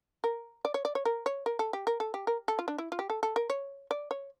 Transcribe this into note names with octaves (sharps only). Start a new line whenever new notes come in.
A#4
D5
C#5
D5
C#5
A#4
C#5
A#4
A4
G4
A#4
A4
G4
A#4
A4
F4
D4
E4
F4
G4
A4
A4
A#4
C#5
D5
C#5